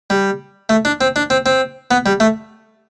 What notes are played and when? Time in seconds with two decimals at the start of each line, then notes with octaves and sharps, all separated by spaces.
0.10 G3
0.69 A3
0.85 D4
1.01 C4
1.16 D4
1.30 C4
1.46 C4
1.91 B3
2.06 G3
2.20 A3